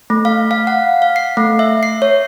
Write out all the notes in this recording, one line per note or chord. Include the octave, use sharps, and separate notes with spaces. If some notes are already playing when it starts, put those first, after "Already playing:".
A3
F5
F5
F#5
F5
C7
A3
E5
C7
C#5